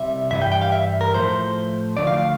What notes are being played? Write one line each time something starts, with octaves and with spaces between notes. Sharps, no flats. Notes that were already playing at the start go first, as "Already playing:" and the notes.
Already playing: C2 C3 G3 E5
G2 E3 G3 E5
G5
G5
F5
E5
A#4
A2 F3 A3 C5
D2 D3 F3 A3 D5
F5
F5